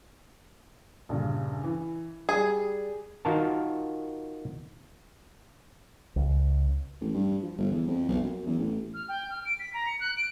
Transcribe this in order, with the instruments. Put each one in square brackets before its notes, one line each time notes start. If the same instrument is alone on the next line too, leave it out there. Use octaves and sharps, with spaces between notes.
[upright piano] A#1 G2 C#3
E3
[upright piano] G3 D5 [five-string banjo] G#4
[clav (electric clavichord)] D#3 F4 F#4 A#4 A5
[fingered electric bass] C#2
[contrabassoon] A1
G2
F3
G1
E2
F2
B1
F#2
E2
A1
[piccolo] F6
G5
F6
D7
B6
A#5
C#7
F#6
D7